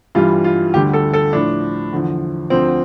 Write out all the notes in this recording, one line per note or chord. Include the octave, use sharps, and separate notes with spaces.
G2 E3 G3 F4
F4
D2 D3 G3 G4
A4
A4
A2 F3 D4
E2 D3 F3
D2 D3 F3 C4